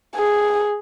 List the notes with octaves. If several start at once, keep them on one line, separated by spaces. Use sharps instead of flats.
G#4